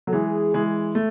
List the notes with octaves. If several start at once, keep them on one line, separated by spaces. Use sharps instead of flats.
F#3 A4
E3 G#3 G#4
E3 G#3
A3